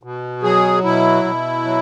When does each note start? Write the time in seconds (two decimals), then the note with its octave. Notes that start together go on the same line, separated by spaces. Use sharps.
0.03 B2
0.43 F#3 G#4
0.84 B2 E4
1.24 B2
1.65 F#3